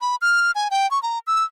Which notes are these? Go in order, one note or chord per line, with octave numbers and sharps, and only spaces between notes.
B5
F6
G#5
G5
C#6
A#5
E6